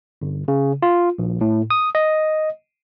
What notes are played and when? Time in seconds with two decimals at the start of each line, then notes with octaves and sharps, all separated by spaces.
0.22 G1
0.48 C#3
0.82 F4
1.18 A#1
1.41 A2
1.70 D#6
1.95 D#5